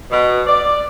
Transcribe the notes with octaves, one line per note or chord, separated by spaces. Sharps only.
B2
D5